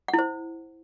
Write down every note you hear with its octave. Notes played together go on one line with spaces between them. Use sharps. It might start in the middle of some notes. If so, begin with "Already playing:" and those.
F#5
E4
C5